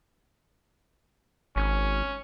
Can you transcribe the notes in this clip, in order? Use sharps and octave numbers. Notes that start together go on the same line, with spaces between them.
G#1 C#4